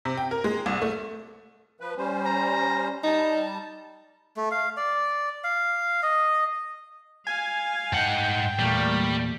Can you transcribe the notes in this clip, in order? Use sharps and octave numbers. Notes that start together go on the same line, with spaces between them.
C3
G5
A#4
G#3
C2
A3
F3 B4
G3 C#4 C5
A#5
G3 D#4 A5
A3
F5
D5
F5
D#5
F5 G#5
G#2 F#5 G5 A5
E2 A#2 G3 A3 A#3 D5